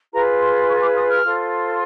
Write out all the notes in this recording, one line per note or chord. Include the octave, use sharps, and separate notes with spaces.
F4 G#4 B4 A#5
C6
C6
C#6
D6
D#6
F6
F4 A4 C5